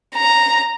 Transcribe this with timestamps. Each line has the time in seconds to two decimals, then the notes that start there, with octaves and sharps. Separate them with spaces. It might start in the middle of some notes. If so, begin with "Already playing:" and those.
0.16 A#5